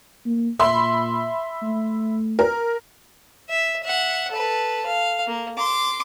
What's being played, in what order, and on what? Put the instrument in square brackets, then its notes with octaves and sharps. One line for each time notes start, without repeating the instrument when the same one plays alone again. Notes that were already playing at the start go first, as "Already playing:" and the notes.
[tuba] A#3
[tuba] A#2 [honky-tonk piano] E5 B5 C6
[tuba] A3
[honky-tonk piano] A#4
[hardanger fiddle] E5
E5 F#5
A4 B4
F5
A#3
C6 D6